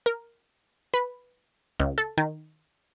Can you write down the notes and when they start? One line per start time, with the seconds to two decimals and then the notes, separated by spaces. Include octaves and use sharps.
0.06 A#4
0.94 B4
1.80 C#2
1.98 A4
2.18 D#3